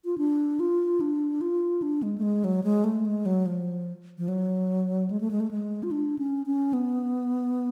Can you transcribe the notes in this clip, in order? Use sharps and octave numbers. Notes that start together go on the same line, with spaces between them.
F4
D4
F4
D4
F4
D4
G#3
A3
G#3
F#3
G#3
A3
G#3
F#3
F3
F3
F#3
G#3
A3
G#3
A3
G#3
F4
D4
C#4
C#4
B3